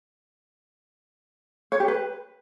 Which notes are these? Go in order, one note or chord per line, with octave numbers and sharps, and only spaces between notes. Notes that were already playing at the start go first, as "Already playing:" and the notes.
C#5
G4
B4